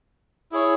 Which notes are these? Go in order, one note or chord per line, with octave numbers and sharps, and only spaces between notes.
E4 G#4 C#5